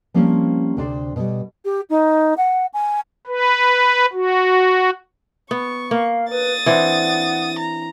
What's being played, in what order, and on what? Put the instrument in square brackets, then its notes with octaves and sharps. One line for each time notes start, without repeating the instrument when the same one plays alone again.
[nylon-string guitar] F3 G3 A#3 C4 C#4 E4
D2 C3 D4 C5 D5
B2 G3
[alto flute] G4
D#4
F#5
G#5
[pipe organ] B4
F#4
[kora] B3 [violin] C#6
[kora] A#3 [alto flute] F5
[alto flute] B4 [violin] D#6 A6
[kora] E3 C4 D4 [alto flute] F#5
[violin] A#5